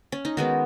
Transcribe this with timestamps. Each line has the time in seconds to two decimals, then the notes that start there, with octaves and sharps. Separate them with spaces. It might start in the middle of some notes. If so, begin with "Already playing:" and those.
0.12 C#4
0.25 D#4
0.37 D#3 G#3 B3 F#4